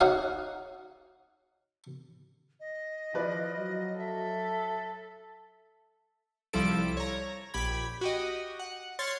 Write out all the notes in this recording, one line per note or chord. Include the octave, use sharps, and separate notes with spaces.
D#4 F#4 C#5 F5
D#5
F3 E4 B4 D5
F#3
A4 E5
C2 F3 G3 E4 A4 D7
C#5 A#5
A#1 G4 B5 G#6
F#4 G4 D#5
F#5
C#5 C6 F6 A6 C7